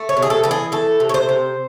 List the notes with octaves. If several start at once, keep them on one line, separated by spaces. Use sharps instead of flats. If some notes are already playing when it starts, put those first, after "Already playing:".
Already playing: A3
C#5
C3
G#4
A4
E3 A4
G#4
A3 A4
C3
C#5
C5
C3